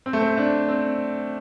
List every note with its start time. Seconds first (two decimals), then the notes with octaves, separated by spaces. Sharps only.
0.06 C4
0.13 A3
0.21 C4
0.37 D4
0.69 C4